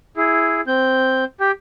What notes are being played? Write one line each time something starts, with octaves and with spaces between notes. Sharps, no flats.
E4 G#4
C4 G6
G4 G5